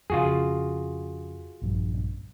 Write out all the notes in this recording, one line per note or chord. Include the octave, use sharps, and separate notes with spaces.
F2 C#3 F4 F#4 G#4
A#1 G2 F3